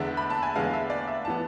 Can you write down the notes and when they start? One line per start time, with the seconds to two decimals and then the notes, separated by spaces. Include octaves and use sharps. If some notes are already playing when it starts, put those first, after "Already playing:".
Already playing: E2 D3 G#3 B3 E5
0.17 B5
0.30 A5
0.43 G#5
0.55 E2 D3 G#3 B3 F5
0.73 E5
0.90 D5
1.08 E5
1.25 E3 B3 A5